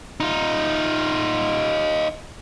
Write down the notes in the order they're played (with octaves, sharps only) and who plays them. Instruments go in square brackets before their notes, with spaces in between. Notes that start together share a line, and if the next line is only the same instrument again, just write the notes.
[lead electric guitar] D#4 F4